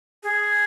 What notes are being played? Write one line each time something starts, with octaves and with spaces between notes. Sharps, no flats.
G#4